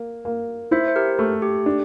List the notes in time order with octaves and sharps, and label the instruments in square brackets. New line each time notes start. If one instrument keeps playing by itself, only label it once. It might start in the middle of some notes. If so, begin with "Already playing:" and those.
Already playing: [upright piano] A#3
A#3
[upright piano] E4 [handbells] C5 E5
[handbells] C5
G4 A#4
[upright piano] A3
[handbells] G4
[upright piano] D4